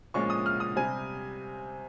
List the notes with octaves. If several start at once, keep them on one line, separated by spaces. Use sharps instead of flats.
A#2 F3 G#3 C#4 C#6
D#6
F6
D#6
C3 G3 C4 G#5